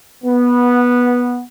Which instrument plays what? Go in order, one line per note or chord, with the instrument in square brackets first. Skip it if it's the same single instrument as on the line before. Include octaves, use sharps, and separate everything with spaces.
[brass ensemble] B3